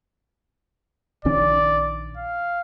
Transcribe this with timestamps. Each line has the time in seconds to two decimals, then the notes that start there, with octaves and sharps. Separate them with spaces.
1.25 A#1 D#3 C#4 D5
2.17 F5